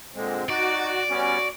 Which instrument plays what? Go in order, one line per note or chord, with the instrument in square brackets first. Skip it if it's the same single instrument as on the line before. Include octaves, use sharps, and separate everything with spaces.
[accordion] A#2 D3 G#3 [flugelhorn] C4
[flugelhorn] D#4 [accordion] F#4 [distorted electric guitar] D5
[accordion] G3 B3 C#4 [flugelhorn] F#4